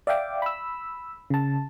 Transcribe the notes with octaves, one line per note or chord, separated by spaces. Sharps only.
D5 E5 F5 G5 D6
B5 E6
C#3 A5